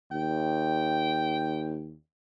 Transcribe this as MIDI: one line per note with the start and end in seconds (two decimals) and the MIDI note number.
0.11 1.96 39
0.11 1.84 79